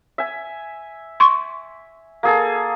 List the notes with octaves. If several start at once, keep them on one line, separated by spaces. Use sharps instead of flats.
E5 G#5
C6 C#6
A#3 G#4 A4